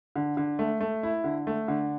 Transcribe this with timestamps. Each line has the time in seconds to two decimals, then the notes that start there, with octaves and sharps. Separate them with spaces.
0.16 D3
0.37 D3
0.59 A3
0.80 A3
1.03 E4
1.24 D3
1.47 A3
1.68 D3